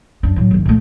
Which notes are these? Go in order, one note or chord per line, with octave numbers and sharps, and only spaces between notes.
F#2 D4
A2 F#3
G1 D#2
A#2 A3